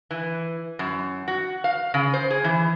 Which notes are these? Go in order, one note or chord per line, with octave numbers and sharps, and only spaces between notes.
E3
F#2
F#4
F5
C#3
C5
G#4
E3